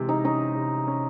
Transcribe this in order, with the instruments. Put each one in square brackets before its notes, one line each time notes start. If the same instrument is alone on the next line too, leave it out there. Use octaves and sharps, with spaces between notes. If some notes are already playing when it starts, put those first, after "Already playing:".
Already playing: [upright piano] C3 E3 G#3
[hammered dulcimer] D#4
[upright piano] C#4 [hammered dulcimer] D#4
[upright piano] C3
C#4